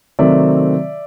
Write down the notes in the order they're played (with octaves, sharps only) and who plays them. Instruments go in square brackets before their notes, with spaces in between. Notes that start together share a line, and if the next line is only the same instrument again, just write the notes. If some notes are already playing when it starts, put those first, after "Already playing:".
[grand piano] C3 D#3 F#3 A3 C4 D5 E5